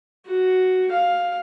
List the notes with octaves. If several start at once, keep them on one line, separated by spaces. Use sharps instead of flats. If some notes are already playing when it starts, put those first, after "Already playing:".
F#4
F5